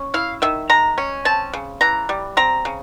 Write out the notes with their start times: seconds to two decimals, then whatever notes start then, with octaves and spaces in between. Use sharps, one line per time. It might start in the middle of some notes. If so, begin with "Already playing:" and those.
Already playing: C#4
0.14 E4 F5
0.42 D#3 E5
0.69 G#3 A#5
0.98 C#4
1.25 C4 A5
1.53 C#3
1.81 E3 A#5
2.09 G3
2.37 C4 A#5
2.65 C#3